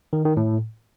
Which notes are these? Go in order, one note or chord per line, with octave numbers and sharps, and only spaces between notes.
D#3
D#3
A2